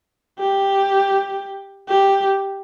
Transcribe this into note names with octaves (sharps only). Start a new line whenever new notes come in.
G4
G4